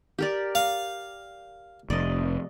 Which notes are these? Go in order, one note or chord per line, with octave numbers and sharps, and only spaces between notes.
G4 A#4 D5
F5
F1 D5 D#5